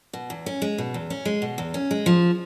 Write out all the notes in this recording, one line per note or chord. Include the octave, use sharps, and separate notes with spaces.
B2
E2
C#4
G#3
B2
E2
C#4
G#3
B2
E2
C#4
G#3
F3